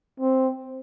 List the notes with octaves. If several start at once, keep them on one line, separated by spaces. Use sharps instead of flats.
C4